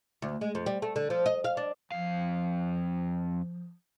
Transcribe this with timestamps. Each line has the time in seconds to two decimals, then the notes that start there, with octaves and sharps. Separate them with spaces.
0.22 D2
0.41 G#3
0.55 F2
0.66 G3
0.82 A3
0.96 D3
1.10 F3
1.26 D#5
1.44 F5
1.57 D4
1.92 F2 F3 F5